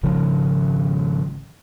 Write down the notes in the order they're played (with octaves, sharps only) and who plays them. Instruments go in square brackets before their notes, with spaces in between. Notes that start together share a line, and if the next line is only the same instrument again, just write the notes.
[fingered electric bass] G#1 C#3 F3